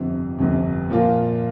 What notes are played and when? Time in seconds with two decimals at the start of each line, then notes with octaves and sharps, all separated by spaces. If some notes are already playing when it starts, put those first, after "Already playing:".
Already playing: G1 F2 C3
0.38 G1 F2 C3
0.90 A#2 F3 A#3 F4